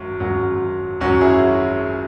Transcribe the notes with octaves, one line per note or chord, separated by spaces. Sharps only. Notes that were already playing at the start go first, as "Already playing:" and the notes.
Already playing: G#1 F#2 F#3
G#1 F#2 F#3
G#1 F#2 F#3 C#4 F#4
E4 G#4